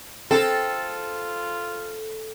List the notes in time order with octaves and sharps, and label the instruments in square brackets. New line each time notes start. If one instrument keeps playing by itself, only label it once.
[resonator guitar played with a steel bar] C4 [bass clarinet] F4 [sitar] A4